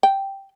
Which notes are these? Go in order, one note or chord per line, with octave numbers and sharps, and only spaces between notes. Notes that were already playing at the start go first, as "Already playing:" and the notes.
G5